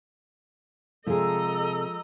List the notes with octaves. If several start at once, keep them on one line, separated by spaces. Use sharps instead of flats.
C3 F3 G#3 G#4 A4 D#5 A#5 E6